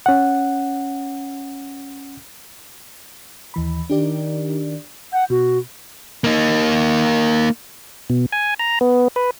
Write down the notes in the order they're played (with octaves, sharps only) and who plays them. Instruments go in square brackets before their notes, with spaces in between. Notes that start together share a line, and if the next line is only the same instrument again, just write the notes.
[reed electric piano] C#4 F#5
[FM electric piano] D#2 E3 B5
[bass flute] D#3 [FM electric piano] D4 G4 D5
[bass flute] F#5 [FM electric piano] G6
[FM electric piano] B2 [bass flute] F#4
[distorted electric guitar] A#3 D#4
[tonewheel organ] B2
G#5
A#5
B3
B4